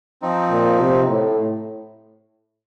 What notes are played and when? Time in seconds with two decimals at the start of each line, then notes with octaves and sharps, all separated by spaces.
0.22 F3 C4 D#4
0.50 A#2
0.80 C3
1.08 A2